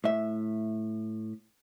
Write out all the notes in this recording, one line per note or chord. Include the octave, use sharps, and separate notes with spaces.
A2 E5